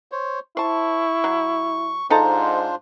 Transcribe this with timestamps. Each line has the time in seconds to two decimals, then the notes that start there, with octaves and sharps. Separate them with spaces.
0.12 C5 C#5
0.57 E4 C5 A5 C#6
1.24 F#3
2.10 G#2 D4 D#4 F4 A4 C5 A#5